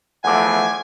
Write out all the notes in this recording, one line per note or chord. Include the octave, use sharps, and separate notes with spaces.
E2 F3 A3 F#5 G#5 D6